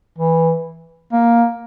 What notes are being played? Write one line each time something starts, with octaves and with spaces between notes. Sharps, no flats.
E3
A#3